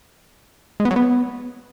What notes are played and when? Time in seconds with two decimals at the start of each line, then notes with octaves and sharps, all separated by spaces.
0.80 G#3
0.85 B3
0.91 F#3
0.96 B3